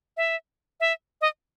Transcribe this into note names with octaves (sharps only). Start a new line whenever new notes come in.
E5
E5
D#5